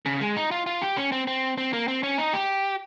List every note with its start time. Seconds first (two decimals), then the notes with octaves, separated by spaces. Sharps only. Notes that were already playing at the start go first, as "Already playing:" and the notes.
0.06 C#3
0.21 G#3
0.36 D#4
0.51 F4
0.66 F4
0.82 G4
0.97 C#4
1.12 C4
1.27 C4
1.58 C4
1.73 A#3
1.88 C4
2.03 C#4
2.18 D#4
2.33 G4